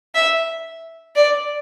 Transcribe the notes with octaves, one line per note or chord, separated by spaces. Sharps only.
E5
D5